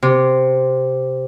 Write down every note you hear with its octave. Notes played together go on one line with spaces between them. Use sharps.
C3